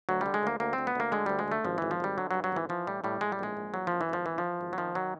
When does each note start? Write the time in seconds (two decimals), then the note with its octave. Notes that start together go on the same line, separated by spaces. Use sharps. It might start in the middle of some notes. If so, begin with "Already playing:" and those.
0.09 D2 F#3
0.21 D3 G3
0.34 G#3
0.43 D2 A#3
0.60 D2 A#3
0.73 C4
0.78 D2
0.87 B3
0.95 D2 A#3
1.12 D3 G#3
1.26 D2 G3
1.39 G#3
1.48 D3 A3
1.65 G#1 F3
1.78 G#1 E3
1.91 F3
2.00 G#1 G3
2.18 D3 F#3
2.31 G2 F#3
2.44 F#3
2.52 G#1 E3
2.69 E3 F3
2.87 A2 G3
3.04 A2 G3
3.21 A2 G#3
3.32 G3
3.39 A#1 G#3
3.57 A#1
3.74 E3 F#3
3.87 F#2 F3
4.01 E3
4.09 G#1 F3
4.26 E3
4.38 F3
4.44 E3
4.61 G#1
4.73 F#3
4.78 D#3 F3
4.95 D#3 F#3